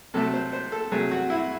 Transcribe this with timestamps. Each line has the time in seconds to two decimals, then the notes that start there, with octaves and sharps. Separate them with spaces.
0.14 C3 F#3 A3 A4
0.34 C5
0.53 C5
0.72 A4
0.91 C3 F#3 A3 G#4
1.11 F#4
1.30 E4